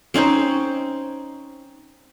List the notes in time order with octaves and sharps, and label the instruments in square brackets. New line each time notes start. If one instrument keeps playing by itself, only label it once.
[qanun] C4 C#4 D#4 C5